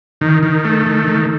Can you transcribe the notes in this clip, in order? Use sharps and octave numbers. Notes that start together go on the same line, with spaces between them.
D#3
D#3
A3
D#3
D#3